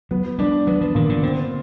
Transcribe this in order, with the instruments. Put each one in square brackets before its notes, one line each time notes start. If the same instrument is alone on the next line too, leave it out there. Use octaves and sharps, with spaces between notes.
[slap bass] F#3 [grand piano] B3
[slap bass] G3 [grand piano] D4
[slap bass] F#3 [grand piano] B3
[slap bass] F3
[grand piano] A#2 [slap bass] D#3
[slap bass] D3
[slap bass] D3 [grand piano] C4